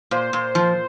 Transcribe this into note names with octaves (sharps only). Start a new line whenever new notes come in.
A#2 C5
A#2
F3